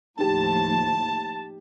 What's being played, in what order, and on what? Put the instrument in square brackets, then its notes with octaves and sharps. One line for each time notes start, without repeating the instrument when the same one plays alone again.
[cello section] D#2 A2 F3 [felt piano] D#4 G4 [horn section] A5